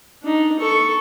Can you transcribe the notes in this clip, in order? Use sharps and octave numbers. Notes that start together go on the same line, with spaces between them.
D4 D#4
A4 C#6